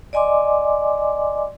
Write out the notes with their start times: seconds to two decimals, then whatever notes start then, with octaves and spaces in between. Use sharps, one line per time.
0.13 D5 D#5 G#5 C6 D6